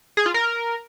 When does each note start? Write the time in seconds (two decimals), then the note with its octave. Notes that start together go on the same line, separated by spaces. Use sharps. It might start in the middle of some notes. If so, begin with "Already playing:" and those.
0.17 G#4
0.26 F4
0.34 A#4